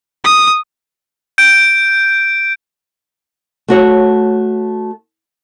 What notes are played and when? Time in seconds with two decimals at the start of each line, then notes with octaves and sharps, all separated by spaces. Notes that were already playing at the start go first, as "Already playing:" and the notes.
0.24 D#6
1.38 G6 D7
3.68 A3 F#4 C#5